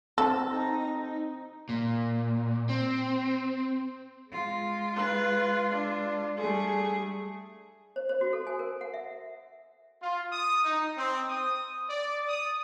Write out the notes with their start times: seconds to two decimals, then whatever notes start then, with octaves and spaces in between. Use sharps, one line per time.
0.18 C4 A4
0.50 D#4 A#5
0.97 D#4
1.69 A#2
2.69 C4
4.31 G#3 F4
4.96 B4
5.70 D4
6.37 G3 A3 G#4
7.96 C5
8.09 C5
8.21 F#4
8.33 A4
8.47 G#5
8.59 A#4
8.81 F#5
8.94 E5
10.02 F4
10.33 D#6
10.65 D#4
10.97 C4
11.29 D#6
11.90 D5
12.29 D#6